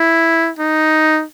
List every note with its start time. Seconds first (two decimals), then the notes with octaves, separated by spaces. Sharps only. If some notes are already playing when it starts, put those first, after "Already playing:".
Already playing: E4
0.58 D#4